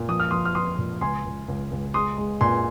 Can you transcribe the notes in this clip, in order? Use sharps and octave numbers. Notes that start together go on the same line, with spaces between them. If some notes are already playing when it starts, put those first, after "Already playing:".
Already playing: A#2
F3 D#6
F6
F3 C6 D#6
F6
F3 C6 D#6
A#2
C#2 G#5 C6
C#2
C#2
C#2
G#3 C6 D#6
G#3
A#2 G#5 C6